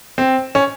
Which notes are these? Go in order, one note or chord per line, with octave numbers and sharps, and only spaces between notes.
C4
C#4